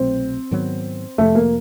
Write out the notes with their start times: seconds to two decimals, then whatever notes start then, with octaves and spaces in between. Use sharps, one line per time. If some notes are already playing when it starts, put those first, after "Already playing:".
Already playing: C2 B2 F#3 A3 C4
0.51 G#2 D#3 F#3 B3
1.18 F2 C3 F3 A3
1.35 A#3